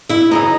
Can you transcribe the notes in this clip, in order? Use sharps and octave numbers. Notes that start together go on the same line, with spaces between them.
E4 E5
F#2 C#3 E3 D#4 D#5